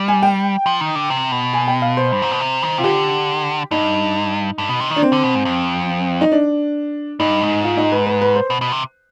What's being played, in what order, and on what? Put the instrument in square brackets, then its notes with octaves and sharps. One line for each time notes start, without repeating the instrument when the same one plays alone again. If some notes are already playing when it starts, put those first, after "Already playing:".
Already playing: [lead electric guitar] G3
[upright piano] G#5
G5
[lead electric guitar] F3
D#3
D3
C3
B2
[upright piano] G#5
G5
F5
C5
[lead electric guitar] G2
G#2
B2
C3
D#3
[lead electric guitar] C3 [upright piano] F4
[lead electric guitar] D3 [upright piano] G4
[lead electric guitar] G2 [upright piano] D#4
[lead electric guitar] G2
B2
C3
D#3
[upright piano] D4
C4
[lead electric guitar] D3
B2
G#2
F2
[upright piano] D#4
D4
[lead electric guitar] G2 [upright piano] D#4
[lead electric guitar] G#2
[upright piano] F4
D#4
B4
B4
B4
C5
[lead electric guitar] B2
B2
C3